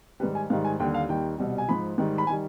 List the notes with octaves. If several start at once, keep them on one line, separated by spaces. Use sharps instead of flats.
G#2 D#3 G3 B4
G#5
G#2 D#3 G3 F5
G#5
D#2 D3 G3 G5
F5
D#2 D#3 G3 G5
C2 B2 G3
G#5
G#2 F3 B5
G#2 D#3 G3
B5
D#3 G3 G#5